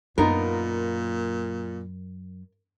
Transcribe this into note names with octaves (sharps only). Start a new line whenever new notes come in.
F#2 A#2 B3 D#4 F4 A#4